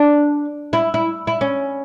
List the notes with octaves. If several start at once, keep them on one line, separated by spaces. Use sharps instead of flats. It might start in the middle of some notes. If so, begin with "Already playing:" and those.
Already playing: D4
E4
E4
E4
C#4